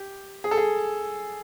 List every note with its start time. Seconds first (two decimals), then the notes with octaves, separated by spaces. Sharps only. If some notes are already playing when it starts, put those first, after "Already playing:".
Already playing: G4
0.44 G#4
0.51 A4
0.57 G#4